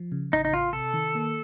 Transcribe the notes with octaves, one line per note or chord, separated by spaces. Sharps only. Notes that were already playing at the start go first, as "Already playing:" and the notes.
Already playing: F3
C#3
A1 D#4
D#4
A1 F4
C3 A4
D#3
A#3